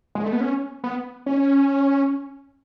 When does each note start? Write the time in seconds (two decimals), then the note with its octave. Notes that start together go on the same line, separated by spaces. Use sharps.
0.15 G#3
0.24 A3
0.33 B3
0.40 C#4
0.84 B3
1.26 C#4